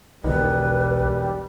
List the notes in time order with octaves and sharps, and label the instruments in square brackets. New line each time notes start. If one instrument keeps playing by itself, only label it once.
[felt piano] E1 D#4 [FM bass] B1 [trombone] G3 [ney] B4